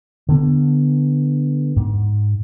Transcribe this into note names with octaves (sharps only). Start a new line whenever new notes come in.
D3 B3
G#2